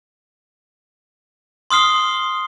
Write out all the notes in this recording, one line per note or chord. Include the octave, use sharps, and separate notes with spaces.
C6 D#6 F6 C7 G7